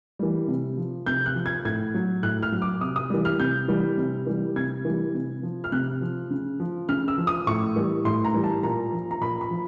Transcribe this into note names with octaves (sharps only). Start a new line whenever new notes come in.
E3 G3
C3
F3
C3 G6
F#6
F3
G#6
A2 G#6
F#3
A2 F#6
F6
F#3
D6
C3 D#6
D#6
E3 G3
F6
C3 G6
E3 G3
C3
E3 G3
C3 G#6
E3 G3
C3
F3
F6
C3 F#6
F3
C#3
F3
C#3 F6
E6
F3
D#6
A2 C#6
E3 G3
A2 C6
A#5
E3 G3
A5
A#2 A#5
F3
A#5
A#2 B5
B5
F3